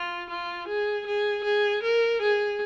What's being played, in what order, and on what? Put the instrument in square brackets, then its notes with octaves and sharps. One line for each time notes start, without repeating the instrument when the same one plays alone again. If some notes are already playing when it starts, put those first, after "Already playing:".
Already playing: [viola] F4
F4
G#4
G#4
G#4
A#4
G#4